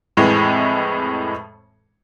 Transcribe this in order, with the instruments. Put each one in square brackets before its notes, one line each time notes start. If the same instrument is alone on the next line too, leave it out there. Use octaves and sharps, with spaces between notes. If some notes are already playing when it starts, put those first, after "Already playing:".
[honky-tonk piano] F2 A2 E3 G#3